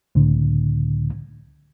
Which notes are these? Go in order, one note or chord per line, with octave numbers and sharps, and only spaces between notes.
C#2 A2 D3